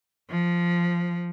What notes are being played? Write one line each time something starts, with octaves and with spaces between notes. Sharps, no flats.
F3